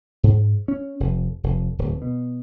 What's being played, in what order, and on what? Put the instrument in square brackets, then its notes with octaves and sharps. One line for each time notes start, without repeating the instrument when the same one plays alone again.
[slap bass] G#2
C#4
F1
F1
D1
B2